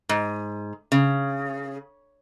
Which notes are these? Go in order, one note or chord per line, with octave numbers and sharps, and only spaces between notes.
G#2
C#3